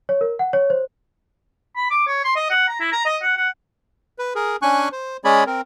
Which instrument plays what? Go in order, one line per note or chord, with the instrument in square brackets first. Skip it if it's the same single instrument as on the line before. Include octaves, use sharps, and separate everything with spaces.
[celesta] C#5
A#4
F#5
C#5
C5
[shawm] B5
D6
C#5
C6
D#5
F#5
A#5
E4
A#5
D#5
F#5
F#5
[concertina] B4
G#4 A#4
C#4 D4 G#5 C#6 F#6
C5
G#3 C#4 G#4 C#5 D5 B5
C4 A#4